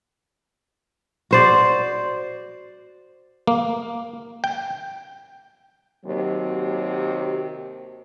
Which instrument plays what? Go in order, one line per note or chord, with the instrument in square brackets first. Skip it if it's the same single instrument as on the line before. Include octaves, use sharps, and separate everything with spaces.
[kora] F#4 C5 D5
[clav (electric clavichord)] A#3
G5
[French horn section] D#2 C3 F#3